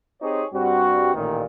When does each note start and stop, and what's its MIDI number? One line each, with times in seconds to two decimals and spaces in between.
0.22 0.45 60
0.22 0.45 63
0.22 0.45 67
0.22 0.45 68
0.22 0.45 72
0.22 0.45 73
0.53 1.12 43
0.53 1.12 55
0.53 1.12 60
0.53 1.12 66
1.14 1.45 33
1.14 1.45 46
1.14 1.45 51